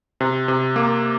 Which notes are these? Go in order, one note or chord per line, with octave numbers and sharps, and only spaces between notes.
C3
C3
A#3